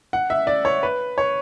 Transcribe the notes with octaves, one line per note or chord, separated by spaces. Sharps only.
F#5
E5
D5
C#5
B4
C#5